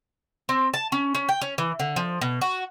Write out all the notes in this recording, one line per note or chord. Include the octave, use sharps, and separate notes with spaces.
C4
A5
C#4
C#4
G5
C#4
E3
D3
F3
B2
F#4